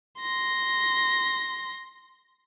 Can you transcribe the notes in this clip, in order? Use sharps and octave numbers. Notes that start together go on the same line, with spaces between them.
C6 A#6